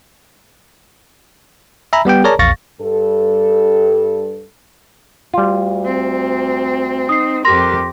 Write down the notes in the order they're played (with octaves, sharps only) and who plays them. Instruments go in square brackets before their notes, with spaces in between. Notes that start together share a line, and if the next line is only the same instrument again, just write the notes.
[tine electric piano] E5 G#5 A#5 B5
G3 B3 G4 G5
G#4 A#4 C#5 D5 A5 A#5
A#1 E2 F5 C#6 A6 A#6
[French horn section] G2 A4
[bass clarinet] D2 [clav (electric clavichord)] G3 F4
[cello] C4
[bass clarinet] D#4 [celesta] D#6 C7
[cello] F2 G4 [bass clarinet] A#4 [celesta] C6 A#6